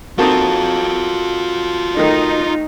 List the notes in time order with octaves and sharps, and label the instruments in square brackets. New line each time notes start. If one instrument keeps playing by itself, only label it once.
[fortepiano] A#3 C4 D#4 [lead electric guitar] F4 A4 [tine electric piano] F#4 A5
[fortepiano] D#3 A3 [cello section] D#4